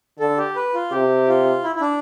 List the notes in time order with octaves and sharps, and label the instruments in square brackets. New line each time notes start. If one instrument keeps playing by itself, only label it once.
[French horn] D3 [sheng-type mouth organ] A4
[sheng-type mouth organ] G4
B4
F4
[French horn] C3 [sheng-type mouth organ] G4
[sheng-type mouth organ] F4
E4
E4
D4